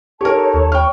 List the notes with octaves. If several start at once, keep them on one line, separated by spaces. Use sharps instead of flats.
D#4 G4 A4 A#4 C#5 A5
D#2
G5 B5 C#6 F6